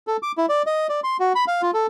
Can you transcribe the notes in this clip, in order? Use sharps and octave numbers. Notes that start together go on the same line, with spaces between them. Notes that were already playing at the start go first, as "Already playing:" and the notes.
A4
D6
E4
D5
D#5
D5
C6
F#4
B5
F5
F4
A4